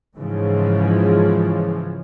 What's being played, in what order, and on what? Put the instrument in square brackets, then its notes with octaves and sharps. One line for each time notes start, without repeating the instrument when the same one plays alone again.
[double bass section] G#2 C#3 E3 F3 G#3